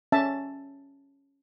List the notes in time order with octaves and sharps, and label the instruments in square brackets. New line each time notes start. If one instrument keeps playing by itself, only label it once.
[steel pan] C#4 E5 A5